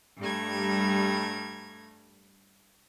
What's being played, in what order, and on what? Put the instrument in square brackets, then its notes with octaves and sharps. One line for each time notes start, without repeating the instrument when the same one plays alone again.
[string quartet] G2 G3 A3 A#5 G#6